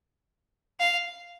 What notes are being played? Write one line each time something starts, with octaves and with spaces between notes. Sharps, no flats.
F5